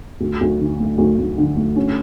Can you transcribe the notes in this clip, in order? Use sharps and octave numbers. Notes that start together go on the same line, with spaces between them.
D2
D2
D3
A3
D2
D2
D3
A3
C#4